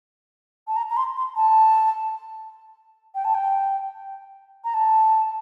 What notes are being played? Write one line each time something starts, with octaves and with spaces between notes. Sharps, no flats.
A5
A#5
A#5
C6
C6
A5
G5
A5
G5
A#5
A5